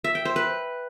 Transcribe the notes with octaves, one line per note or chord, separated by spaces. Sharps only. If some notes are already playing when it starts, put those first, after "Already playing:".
E5
G5
C5
B4